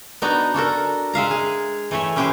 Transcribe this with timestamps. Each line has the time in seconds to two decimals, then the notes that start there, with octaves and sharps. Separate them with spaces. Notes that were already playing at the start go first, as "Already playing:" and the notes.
0.22 B3 D4 D#4 F#4 A#5
0.54 D4 F#4 A4 A#4
1.13 G#3 E5 F5 A#5
1.31 G#4
1.91 E3 A3 C#5 E5
2.16 C#4 E4 G4 B4 C5